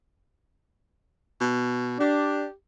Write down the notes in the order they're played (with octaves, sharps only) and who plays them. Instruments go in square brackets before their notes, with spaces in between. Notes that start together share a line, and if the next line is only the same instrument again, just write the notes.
[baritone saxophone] B2
[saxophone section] D4 [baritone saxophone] G4